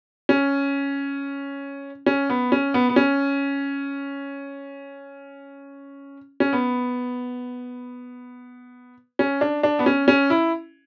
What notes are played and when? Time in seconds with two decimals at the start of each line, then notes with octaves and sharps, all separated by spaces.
0.29 C#4
2.06 C#4
2.29 B3
2.52 C#4
2.74 B3
2.89 B3
2.96 C#4
6.40 C#4
6.53 B3
9.19 C#4
9.41 D4
9.63 D4
9.79 B3
9.86 C#4
10.08 C#4
10.30 E4